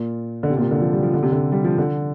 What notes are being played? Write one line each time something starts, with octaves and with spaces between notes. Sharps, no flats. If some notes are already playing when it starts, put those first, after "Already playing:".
Already playing: A#2
D3
C3
A#2
C3
D3
F3
G3
F3
D3
C3
D3
G3
F3
D3